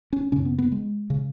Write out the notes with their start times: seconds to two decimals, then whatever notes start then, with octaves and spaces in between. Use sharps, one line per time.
0.13 C#4
0.32 F#2 C#3 C#4
0.45 B3
0.58 B3
0.72 G#3
1.10 C#3